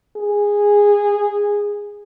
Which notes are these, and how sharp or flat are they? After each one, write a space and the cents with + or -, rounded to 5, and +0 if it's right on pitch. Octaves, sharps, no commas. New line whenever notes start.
G#4 -15